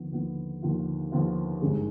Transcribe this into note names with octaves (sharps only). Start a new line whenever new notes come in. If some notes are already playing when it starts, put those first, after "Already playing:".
Already playing: D#2 D3 F3 B3 F4
D#2 D3 F3 B3 F4
D#2 D3 F3 B3 F4
D#2 D3 F3 B3 F4
G#1 G2 D#3 G#3